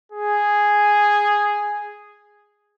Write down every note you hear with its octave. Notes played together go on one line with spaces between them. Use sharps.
G#4